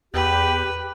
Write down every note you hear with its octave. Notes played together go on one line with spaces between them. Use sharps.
E2 G4 B4